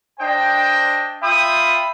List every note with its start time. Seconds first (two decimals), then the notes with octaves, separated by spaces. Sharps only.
0.20 D4 C5 D#5 G5
1.23 F4 E5 G5 B5 D#6